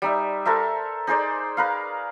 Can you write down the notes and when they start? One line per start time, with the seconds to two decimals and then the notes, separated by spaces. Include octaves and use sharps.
0.02 G3 D#4 E5
0.46 A4 A#4 C5 E5
1.07 D#4 G#4 C5 D5
1.57 A#4 B4 F5